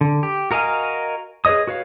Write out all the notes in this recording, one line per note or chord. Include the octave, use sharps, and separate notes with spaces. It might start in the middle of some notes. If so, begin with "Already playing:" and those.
D3
G4
F#4 A#4 D#5 F5 G#5
G#4 B4 C#5 D#5 D#6
F#4 B4 C#5 F5